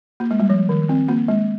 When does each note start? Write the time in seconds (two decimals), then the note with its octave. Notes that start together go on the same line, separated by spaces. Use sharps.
0.20 A#3
0.31 G#3
0.40 G3
0.50 F3
0.69 D#3
0.89 C4
1.08 A#3
1.28 G#3